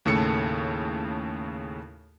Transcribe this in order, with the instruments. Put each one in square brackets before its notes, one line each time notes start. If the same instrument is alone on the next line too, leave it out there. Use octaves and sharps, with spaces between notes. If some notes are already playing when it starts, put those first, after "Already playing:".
[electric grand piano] D#2 A2 C#3 A4 C#7